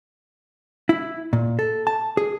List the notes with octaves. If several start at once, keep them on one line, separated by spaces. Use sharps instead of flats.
E4
A#2
A4
A5
G#4